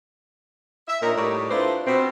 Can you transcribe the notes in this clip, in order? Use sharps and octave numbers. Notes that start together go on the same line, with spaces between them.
E5
A#2 D4 D#4 A#4 C#5 D#5
A2 G3 D#4 C#5 D5
D4 E4 F4 A4 B4 C5
B2 C4